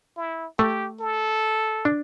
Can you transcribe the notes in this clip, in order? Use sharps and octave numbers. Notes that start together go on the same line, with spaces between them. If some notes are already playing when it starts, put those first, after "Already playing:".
E4
A3 G4
A4
D4